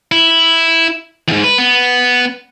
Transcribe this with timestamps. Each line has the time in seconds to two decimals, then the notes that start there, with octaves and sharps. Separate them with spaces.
0.12 E4
1.28 E2 G#2
1.44 B4
1.58 B3